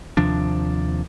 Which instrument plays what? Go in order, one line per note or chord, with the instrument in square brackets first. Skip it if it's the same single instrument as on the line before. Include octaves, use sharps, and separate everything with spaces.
[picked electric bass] D#2 C3 F3 D4